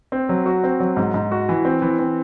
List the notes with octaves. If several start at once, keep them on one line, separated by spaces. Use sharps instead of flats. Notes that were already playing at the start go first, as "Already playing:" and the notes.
C4
F#3
F#4
C4
F#3
G#2
G#2
F#4
E3
C4
E3
C4